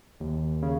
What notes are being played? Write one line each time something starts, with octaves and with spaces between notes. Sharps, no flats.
D#2
C#3